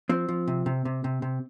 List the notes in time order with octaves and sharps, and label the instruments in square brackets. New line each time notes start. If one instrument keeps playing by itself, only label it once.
[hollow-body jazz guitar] F3 C4
F3
C3
C3
C3
C3
C3